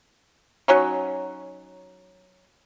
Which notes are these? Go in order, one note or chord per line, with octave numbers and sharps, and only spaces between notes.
F#3 C#4 D#4